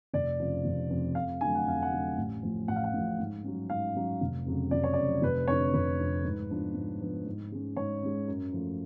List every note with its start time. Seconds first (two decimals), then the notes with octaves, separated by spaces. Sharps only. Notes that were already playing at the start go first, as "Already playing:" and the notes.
0.13 F1 D5
0.40 F2 C#3 F3
0.65 F1
0.90 F2 C#3 F3
1.15 F2 F5
1.41 D3 F#3 A3 G#5
1.55 F#5
1.67 F2 F5
1.82 F#5
1.92 D3 F#3 A3
2.18 A1
2.43 A2 F3
2.68 A1 F#5
2.76 F5
2.84 F#5
2.94 A2 F3
3.20 G#2
3.44 F#3 C#4
3.70 G#2 F5
3.96 F#3 C#4
4.21 F1
4.46 F2 C#3 F#3
4.71 F1 D5
4.84 C#5
4.93 D5
4.97 F2 C#3 F#3
5.22 F1 B4
5.48 F2 D3 C#5
5.74 F1 B4
5.99 F2 D3
6.25 G#2
6.50 F3 B3 D4
6.75 G#2
7.01 F3 B3 D4
7.26 G#2
7.52 G#3 C#4
7.77 G#2 C#5
8.03 G#3 C#4
8.28 F#2
8.53 F3 A3